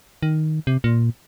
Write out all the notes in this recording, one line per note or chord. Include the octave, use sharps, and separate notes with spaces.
D#3
C3
A#2